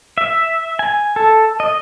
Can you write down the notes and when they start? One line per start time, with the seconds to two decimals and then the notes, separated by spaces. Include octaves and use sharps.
0.18 E5
0.79 G#5
1.16 A4
1.60 D#5